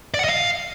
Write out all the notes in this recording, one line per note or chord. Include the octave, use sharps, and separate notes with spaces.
D5
F#5
D#5
F5